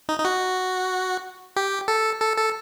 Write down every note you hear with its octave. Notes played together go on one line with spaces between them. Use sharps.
D#4
D#4
F#4
G4
A4
A4
A4